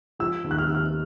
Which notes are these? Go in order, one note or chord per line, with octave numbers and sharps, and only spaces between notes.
F3 E6
D#2
F#6
F6
D#2 E6
F6